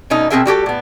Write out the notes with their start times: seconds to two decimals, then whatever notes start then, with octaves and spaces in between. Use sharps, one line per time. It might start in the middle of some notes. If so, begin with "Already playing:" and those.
0.10 B2 A3 C#4 D#4
0.30 B2 C4 C#4 G#4 A#4 E5
0.46 G3 F#4 G4 A4
0.66 A2 B3